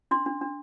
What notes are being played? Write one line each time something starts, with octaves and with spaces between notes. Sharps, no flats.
D4 C6
D4
D4